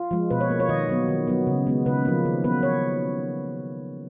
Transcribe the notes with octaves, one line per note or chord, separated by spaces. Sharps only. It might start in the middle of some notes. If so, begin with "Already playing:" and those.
Already playing: F4
F3 G#3
B2 B4
C#5
A#3
C#5
D#3 D#5
F#3 B3
D#3
F#3 B3
C#3
G#3 B3
C#3 B4
F3 A#3
D#3
F#3 B3 B4
C#5